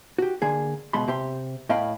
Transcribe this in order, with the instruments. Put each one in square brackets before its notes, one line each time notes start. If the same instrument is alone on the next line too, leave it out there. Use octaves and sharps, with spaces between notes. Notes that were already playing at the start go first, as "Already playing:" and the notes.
[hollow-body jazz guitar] F#4 G4
D3 A#3 G#4
C#2 B2 G#3 B5 C6
C3 G4 C6
A2 D#5 F5 G5 B5